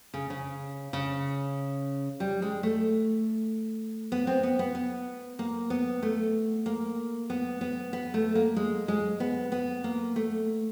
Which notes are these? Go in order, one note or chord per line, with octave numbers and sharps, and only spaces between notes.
C#3
C#3
C#3
G3
G#3
A3
B3
C4
B3
B3
B3
A#3
B3
A3
A#3
B3
B3
B3
A3
A#3
G#3
G#3
B3
B3
A#3
A3